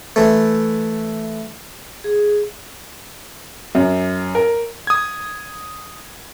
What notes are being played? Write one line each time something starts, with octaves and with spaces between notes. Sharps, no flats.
E3 A3
G#4
F#2
A#4
D#6 G#6